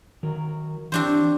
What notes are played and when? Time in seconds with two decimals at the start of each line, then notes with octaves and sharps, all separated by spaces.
0.23 D#3 F#3 A#4
0.92 E3 C4 D4 G4 C5 C#5